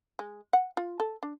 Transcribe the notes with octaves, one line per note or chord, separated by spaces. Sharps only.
G#3
F#5
F4
A4
D4